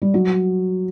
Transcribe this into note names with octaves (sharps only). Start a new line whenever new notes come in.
G3
F#3